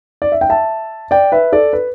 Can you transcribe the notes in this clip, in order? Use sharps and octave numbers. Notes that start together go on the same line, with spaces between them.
D5
E5
G5
E5 A5
D5 G5
B4 E5
A4 D5
B4